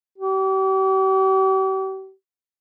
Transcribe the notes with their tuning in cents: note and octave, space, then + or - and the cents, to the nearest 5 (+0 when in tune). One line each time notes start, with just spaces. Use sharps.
G4 -40